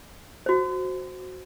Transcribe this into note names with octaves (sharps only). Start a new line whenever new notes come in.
F#4 C5